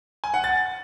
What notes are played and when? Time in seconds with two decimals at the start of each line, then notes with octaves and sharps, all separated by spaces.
0.24 G#5
0.34 F#5
0.44 A6